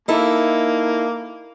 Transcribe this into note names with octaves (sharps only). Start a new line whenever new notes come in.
A#3 D#4 E4 A4